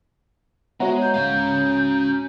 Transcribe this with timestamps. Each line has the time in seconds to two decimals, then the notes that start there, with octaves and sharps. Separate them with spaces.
0.80 G#3 B3 F#4 C#5 E5 F#5 A#5
1.02 G6
1.14 D2 A2 G#3 C#4 F5 G6